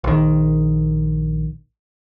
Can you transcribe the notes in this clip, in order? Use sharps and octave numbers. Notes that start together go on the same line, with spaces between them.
A#1 D#3